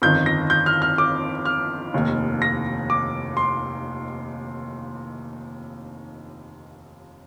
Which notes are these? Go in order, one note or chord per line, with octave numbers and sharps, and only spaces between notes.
G1 F2 D#3 G6
A#6
G6
F6
F6
D6
F6
F1 D#2 D#3
A#6
D6
C6